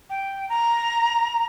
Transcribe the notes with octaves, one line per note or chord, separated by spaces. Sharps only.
G5
A#5